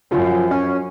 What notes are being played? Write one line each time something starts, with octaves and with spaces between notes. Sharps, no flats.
F#2 F3
C#4